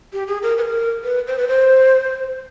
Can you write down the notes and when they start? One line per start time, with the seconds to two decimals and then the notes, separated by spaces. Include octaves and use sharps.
0.13 G4
0.28 G#4
0.43 A#4
0.58 B4
0.62 A#4
1.04 B4
1.27 C5
1.38 B4
1.48 C5